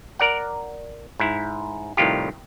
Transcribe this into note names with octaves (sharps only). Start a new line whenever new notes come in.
A#4 D5 F#5
G#2 E4
C2 A2 D#3 F4 G4